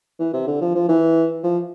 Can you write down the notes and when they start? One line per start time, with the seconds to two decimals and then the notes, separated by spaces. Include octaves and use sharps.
0.19 E3
0.33 C3
0.47 D3
0.61 F3
0.75 F3
0.89 E3
1.44 F3